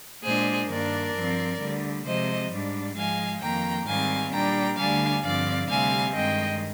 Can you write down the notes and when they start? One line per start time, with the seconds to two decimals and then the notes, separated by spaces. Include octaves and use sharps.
0.24 A#2 G#3 D4 G#4 C5
0.69 G2 D#3 A#3 D4 A#4 D5
1.14 G2 F3 C4
1.60 D2 D3 G3
2.05 C3 F3 G#3 C5 D#5
2.52 G#2 G3 D4
2.96 G#2 F3 G#3 F5 G#5
3.41 F2 D#3 A#3 G5 A#5
3.87 G#2 D#3 G3 C4 F5 G#5
4.32 A#2 G3 D4 G5 A#5
4.77 D2 D3 G3 D4 F5 G#5
5.23 G2 D3 F3 C4 D5 F5
5.68 D2 C3 G3 C4 F5 G#5
6.14 G2 D#3 G#3 D#5 G5